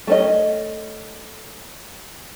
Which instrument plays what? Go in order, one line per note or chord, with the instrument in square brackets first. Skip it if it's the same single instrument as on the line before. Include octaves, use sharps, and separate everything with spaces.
[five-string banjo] A3 C#4 D#5